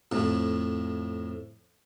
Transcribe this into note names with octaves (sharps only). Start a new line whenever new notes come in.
F2 A2